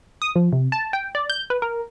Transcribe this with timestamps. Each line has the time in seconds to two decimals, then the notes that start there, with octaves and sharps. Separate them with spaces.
0.22 D#6
0.36 F3
0.52 C3
0.72 A5
0.93 G5
1.15 D5
1.30 G6
1.50 B4
1.62 A#4